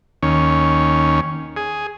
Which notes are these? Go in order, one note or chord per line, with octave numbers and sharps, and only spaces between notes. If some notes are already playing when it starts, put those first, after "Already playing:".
D#2 C#4
G#4